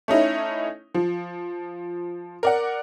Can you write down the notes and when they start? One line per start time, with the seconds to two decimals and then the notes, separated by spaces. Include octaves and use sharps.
0.08 A3 C#4 D#4 E4
0.94 F3
2.43 A#4 D5 F#5